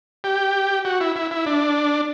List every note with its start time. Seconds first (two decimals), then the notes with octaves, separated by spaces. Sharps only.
0.24 G4
0.85 F#4
1.00 E4
1.16 E4
1.31 E4
1.46 D4